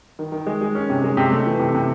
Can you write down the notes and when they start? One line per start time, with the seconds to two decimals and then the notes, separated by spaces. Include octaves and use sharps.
0.19 D#3
0.32 D#3
0.47 G#3
0.61 G#3
0.75 C#4
0.89 C3
1.04 G#3
1.17 C3
1.32 A3
1.46 E3
1.59 C3
1.75 C3